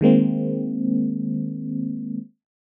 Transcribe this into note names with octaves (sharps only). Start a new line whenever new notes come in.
D#3 G#3 A#3 C4